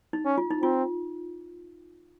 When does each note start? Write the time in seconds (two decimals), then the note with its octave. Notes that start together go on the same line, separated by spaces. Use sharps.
0.13 D#4
0.25 C#4
0.38 F4
0.51 D#4
0.61 C4 F4